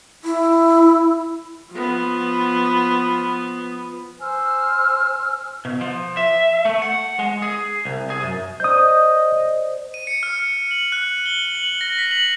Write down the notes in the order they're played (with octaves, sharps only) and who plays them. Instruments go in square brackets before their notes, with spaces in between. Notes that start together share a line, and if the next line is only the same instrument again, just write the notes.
[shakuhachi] E4
[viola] F3 B3
[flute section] C5 G#5 E6 F6
[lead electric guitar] B2
F3
E5
A3
F#5
G#3
G#4
C2
G#4
F#2
[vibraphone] C5 D5 [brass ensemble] D#5 [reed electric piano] D#6 G6
[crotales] D#7
C#7
F6
C#7
F#7
F#6
G7
F#7
A#6
B6
F#7